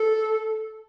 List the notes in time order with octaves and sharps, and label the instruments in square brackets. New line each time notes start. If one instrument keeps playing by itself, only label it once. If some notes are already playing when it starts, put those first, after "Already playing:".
Already playing: [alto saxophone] A4